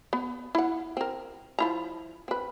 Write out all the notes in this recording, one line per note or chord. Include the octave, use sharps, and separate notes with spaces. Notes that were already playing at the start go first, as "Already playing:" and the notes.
B3
E4 F#5
C4 A#4
F3 E4 A#5
C4 B4